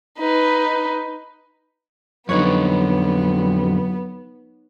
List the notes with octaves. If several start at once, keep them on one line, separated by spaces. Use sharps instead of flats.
D#4 B4
F2 D3 F#3 B3 D#4 B4 C#5